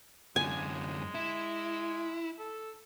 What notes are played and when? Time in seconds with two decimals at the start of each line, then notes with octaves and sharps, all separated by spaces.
0.36 F#2 D3 G#3 G#5
1.15 E4
2.39 A4